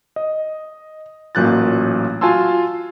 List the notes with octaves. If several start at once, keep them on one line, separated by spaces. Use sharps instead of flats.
D#5
A1 A#2 F#3 F#6 G6 A6
F4 F#4 G#5 A5 C6 E6